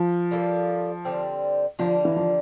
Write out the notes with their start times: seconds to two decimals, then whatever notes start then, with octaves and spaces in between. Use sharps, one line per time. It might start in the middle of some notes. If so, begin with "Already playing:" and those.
Already playing: F3
0.31 G3 A#3 F4 A4
1.05 D3 G3 C4
1.79 D3 F3 G3 A#3
2.05 E3
2.16 F3